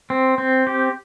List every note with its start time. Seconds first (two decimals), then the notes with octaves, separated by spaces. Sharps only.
0.10 C4
0.38 C4
0.67 G4